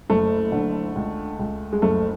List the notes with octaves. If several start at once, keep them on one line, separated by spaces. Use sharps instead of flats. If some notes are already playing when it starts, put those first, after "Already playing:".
F#1 A3
D3
C#2
C#2
G#3
F#1 A3